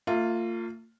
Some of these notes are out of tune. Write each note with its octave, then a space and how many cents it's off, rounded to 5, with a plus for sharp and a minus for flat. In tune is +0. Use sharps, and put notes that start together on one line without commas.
A#3 -45 F4 +0 E5 +0